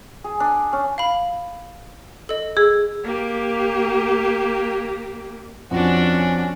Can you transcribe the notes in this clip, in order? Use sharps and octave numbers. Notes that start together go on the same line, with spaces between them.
G#4
D4
C#4
F5 B5
A4 D#5
G#4 E6
A#3 G4
F2 C#4 D4 F#4